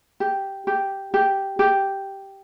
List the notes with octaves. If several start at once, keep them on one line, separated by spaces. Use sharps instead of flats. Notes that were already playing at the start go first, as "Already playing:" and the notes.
G4
G4
G4
G4